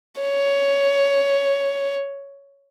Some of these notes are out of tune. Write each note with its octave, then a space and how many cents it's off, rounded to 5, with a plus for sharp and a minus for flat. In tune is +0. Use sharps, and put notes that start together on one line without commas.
C#5 +10